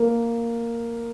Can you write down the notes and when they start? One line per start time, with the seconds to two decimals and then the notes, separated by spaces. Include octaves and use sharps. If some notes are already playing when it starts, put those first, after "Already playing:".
Already playing: A#3